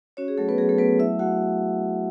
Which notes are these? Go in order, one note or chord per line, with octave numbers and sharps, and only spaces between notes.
C#4 F#4 C#5
G#4
F#3 A3 A4
B3 B4
F#3 G#4
A3 A4
F#3 B3 B4
A3 E4 E5
A3 F#4 F#5